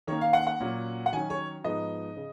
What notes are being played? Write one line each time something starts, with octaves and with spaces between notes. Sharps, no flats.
D#3 A#3 C#4 C#5
F5
F#5
F#5
A#2 F#3 C#4
F#5
D#3 F#3 C#4 G#5
C#5
G#2 F3 B3 D#4 D#5
C#3